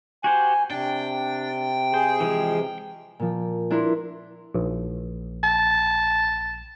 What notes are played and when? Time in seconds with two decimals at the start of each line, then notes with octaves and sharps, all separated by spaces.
0.24 F#4 G4 C5 G#5
0.70 C3 D4 G5
1.94 G#4 C5
2.20 E3 F3 G#3
3.19 A#2 F3
3.71 D4 E4 A#4 C6 B6
4.55 A#1
5.43 A5